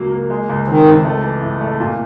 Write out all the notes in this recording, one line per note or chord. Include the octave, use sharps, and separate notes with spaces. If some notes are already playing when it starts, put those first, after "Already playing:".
Already playing: C#2 F#3 A#3
A#3
G#3
C#2
D#3 C4
C#2
A3
E3
A2
A3
A#2